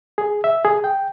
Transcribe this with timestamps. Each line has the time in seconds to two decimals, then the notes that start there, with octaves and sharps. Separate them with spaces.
0.18 G#4
0.44 E5
0.65 G#4
0.84 G5